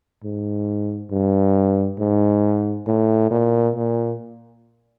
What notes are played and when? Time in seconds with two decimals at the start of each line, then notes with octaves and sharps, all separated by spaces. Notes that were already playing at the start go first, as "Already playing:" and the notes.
0.24 G#2
1.11 G2
1.99 G#2
2.87 A2
3.31 A#2
3.76 A#2